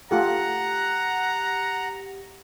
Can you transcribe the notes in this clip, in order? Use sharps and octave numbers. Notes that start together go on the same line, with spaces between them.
A3 F4 G4 A4 F#5 A#5